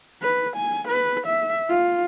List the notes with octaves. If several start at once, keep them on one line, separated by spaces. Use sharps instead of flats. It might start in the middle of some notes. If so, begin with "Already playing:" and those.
B4
G#5
B4
E5
F4